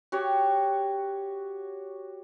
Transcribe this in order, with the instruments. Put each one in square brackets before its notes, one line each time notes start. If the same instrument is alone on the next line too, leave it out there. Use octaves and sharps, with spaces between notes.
[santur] F#4 G4 C#5